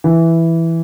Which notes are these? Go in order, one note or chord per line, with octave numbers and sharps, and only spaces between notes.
E3